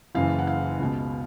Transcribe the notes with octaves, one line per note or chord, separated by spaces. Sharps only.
F#1 F#2 C#3 E3 F5
F#5
F5
C#2
B2